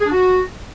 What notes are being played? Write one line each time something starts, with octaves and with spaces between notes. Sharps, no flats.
G#4
D4
F#4